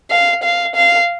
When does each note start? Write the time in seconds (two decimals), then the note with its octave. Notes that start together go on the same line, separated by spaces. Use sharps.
0.11 F5
0.43 F5
0.75 F5